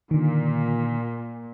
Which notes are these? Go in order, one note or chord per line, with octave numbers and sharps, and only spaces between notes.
A#2 D3 D#3